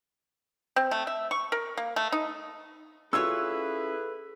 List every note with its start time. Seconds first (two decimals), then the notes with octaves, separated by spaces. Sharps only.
0.76 C4
0.91 A3
1.07 E5
1.31 C#6
1.52 A#4
1.77 A#3
1.96 A3
2.12 D#4
3.13 C#4 E4 F4 G#4 A4 B4 C#5 E6